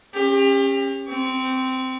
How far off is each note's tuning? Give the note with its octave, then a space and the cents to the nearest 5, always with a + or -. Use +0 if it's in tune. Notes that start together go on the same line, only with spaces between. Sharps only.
C#4 -25 G4 +30
C4 -10 C#6 +35